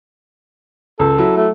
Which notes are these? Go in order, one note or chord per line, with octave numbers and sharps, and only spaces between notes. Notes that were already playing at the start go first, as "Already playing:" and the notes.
C#2 A4
F#3 E4
A3